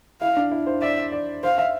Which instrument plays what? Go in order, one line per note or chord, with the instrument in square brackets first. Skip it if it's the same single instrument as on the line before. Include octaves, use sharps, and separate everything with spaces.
[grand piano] E4 [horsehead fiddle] F5
[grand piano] D4
E4
C5
[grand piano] D5 [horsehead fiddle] E5
[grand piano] D5
[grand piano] C5 [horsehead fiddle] F5
[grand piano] E5